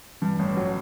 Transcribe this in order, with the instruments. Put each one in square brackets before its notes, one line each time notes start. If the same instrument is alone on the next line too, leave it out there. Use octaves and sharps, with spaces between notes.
[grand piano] G2 [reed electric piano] E3
[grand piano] A1
F#3